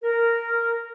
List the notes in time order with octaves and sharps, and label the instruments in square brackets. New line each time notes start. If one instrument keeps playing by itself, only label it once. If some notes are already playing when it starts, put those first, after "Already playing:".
[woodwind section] A#4